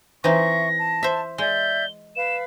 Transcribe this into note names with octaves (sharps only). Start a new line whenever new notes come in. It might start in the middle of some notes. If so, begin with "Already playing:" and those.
E3 C4 D#4 E5 C#6 A#6
A5
C5 E5
G#3 D5 E5 G6 G7
B4 F5 E7